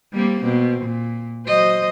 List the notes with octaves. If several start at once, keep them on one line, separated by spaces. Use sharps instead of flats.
G3 A#3 C4
B2 C4
A#2
F#3 C5 D#5